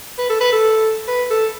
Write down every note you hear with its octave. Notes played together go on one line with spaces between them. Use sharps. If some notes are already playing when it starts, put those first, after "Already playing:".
B4
A4
B4
A4
B4
A4